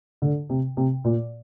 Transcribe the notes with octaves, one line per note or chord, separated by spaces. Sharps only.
D3
C3
C3
A#2